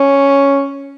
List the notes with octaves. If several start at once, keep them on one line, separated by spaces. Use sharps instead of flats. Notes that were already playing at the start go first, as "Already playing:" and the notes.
Already playing: C#4